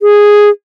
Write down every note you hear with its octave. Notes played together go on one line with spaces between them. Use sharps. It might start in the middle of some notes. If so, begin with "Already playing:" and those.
G#4